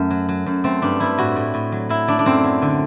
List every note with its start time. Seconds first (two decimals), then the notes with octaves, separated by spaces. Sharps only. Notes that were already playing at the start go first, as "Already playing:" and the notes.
Already playing: F#2 A3
0.11 F#3
0.29 F#3
0.46 F#2
0.64 A3 C4
0.82 G2 D4
1.00 G2 E4
1.18 A2 F#4
1.36 A2
1.54 A2
1.72 F#3
1.89 F#3 E4
2.08 A3 D4
2.19 D4
2.25 F#2 C4
2.44 F#3
2.62 D3